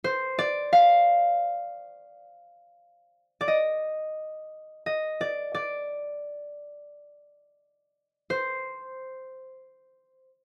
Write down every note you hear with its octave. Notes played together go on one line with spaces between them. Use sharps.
C5
D5
F5
D5
D#5
D#5
D5
D5
C5